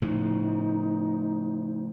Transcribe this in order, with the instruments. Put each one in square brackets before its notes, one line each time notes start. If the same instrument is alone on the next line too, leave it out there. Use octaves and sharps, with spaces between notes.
[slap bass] A2 C#3 F3 [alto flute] D#4